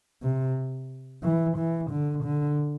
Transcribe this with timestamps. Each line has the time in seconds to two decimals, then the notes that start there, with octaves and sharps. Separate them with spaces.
0.23 C3
1.23 E3
1.57 E3
1.91 D3
2.24 D3